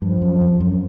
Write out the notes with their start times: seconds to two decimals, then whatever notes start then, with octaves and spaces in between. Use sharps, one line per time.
0.02 G2 F3
0.22 F#2
0.41 F2
0.60 F#2